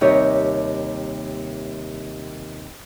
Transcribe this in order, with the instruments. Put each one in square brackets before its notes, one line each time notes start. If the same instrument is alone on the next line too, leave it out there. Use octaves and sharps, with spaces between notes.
[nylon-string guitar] D#2 C3 G3 D#4 A#4 C#5